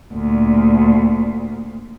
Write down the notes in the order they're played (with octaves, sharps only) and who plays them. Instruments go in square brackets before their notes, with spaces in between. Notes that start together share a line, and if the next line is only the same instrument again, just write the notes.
[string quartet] D2 A#2